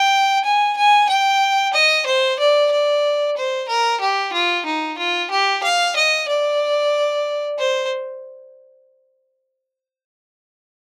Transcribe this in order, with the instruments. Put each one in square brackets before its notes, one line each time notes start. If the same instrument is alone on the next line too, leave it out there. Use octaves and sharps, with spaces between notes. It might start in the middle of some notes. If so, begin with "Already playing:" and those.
Already playing: [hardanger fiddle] G5
G#5
G#5
G5
D#5
C5
D5
D5
C5
A#4
G4
F4
D#4
F4
G4
F5
D#5
D5
C5